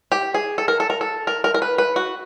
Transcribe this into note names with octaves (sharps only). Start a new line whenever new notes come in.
G4
G#4
A4
A#4
A4
A#4
A4
A#4
A#4
A#4
B4
B4
F#4